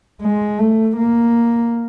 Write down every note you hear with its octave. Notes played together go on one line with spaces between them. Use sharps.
G#3
A3
A#3